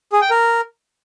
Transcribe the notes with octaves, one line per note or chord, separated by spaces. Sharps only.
G#4
G5
A#4